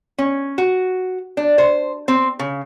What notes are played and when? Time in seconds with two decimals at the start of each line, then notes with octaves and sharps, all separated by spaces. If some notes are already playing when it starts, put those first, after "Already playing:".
0.18 C#4
0.58 F#4
1.37 D4
1.58 C5
2.08 C4
2.39 C#3